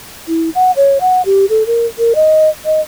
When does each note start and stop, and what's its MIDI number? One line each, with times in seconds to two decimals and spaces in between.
0.28 0.50 64
0.55 0.71 78
0.76 0.98 73
1.01 1.22 78
1.25 1.45 67
1.49 1.66 69
1.66 1.86 70
1.99 2.13 70
2.15 2.49 75
2.65 2.80 75